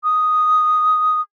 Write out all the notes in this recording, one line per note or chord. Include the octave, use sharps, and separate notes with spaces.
D#6